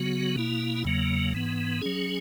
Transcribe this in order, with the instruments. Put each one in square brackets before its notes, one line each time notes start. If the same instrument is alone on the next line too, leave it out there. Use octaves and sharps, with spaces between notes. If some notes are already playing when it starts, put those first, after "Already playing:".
Already playing: [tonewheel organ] C#3 F#3 B3 F#4
B2 A#3 E4
E2 C#3 F#3 A#3
G#2 E3 B3
F#3 C#4 G#4